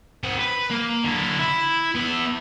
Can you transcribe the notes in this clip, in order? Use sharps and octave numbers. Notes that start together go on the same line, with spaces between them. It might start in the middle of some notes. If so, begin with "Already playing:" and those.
C4 F#5
B4
A#3
D3 E4
E4
B3 E5